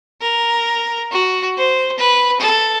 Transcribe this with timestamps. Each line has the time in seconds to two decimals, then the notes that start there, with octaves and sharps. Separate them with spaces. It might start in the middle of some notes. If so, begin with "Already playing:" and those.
0.21 A#4
1.12 F#4
1.57 C5
1.98 B4
2.40 A4